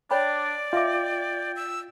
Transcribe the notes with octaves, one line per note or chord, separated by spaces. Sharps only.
D4 C#5 D5 G5 B5
F4 D#5 E5 G5 D6
E6